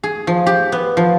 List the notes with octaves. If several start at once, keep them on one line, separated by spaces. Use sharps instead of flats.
G#4
F3
G4
B3
F3